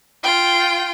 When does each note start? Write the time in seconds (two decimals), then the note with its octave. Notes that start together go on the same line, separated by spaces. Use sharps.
0.23 F4 G5